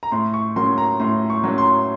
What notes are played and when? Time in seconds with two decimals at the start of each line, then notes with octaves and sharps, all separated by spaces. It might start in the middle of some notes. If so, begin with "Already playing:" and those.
0.03 A#5
0.12 A2 C6
0.34 C#6
0.56 F#3 A#3 C#4 C6
0.78 A#5
1.00 A2 C6
1.30 C#6
1.44 F#3 A#3 C#4
1.58 C6